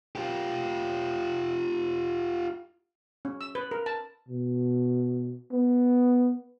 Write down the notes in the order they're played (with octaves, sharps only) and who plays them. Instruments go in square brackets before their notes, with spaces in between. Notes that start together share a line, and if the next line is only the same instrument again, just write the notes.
[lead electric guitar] F4 G4
[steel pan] C#4
E6
B4
A#4
A5
[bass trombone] B2
B3